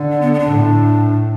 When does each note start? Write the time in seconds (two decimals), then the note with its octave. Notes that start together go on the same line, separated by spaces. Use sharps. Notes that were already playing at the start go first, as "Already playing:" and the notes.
Already playing: D3
0.12 D4
0.21 B3
0.34 B3
0.39 D4
0.49 A2